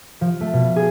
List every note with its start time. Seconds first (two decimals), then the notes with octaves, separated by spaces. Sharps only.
0.21 F3
0.41 A3
0.53 B2
0.76 G#4